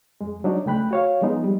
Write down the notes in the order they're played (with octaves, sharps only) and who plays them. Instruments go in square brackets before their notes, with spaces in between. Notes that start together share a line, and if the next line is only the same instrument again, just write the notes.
[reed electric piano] F2 G#3
F#3 D4 D#4 C#5
C#2 A3 G5 B5 F#6
F#4 C#5 F5
F3 G#3 A#3 B3 D#4
G3